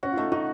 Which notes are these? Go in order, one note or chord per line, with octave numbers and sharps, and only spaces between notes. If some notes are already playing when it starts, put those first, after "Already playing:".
C#4 F#4
F4
A3 D#4
D#4 F#4